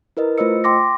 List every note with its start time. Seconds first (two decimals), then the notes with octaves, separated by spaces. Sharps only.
0.17 E4 A#4 B4 D#5
0.38 A3 F4 C5 D#5 E6 C#7
0.64 G5 C6 D6 A#6